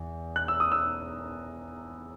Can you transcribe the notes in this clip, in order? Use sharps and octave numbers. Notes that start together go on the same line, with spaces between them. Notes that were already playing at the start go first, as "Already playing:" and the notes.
Already playing: E2
F#6
E6
D#6
E6